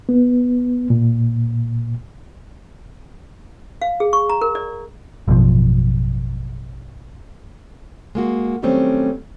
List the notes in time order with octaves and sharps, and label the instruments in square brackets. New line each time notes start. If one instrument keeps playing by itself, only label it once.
[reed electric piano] B3
A#2
[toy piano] F5
G#4
C#6
A#5
A#4
D5
[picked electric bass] A1 F#2 B2 F3
[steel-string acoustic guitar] G#3 A#3 F#4
D#3 F#3 G3 A3 C4 C#4